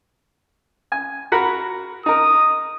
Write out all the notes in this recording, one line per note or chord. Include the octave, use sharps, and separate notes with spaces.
G#5
F#4 A#4 B5
D#4 A#4 D#6